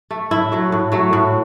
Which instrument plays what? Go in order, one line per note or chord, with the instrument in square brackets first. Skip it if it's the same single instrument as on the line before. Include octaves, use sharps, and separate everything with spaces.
[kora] A3
A2 E4
F#3 A3
A2
F#3 A3
A2